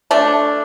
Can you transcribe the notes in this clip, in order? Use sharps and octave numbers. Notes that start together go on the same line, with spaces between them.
A3 D4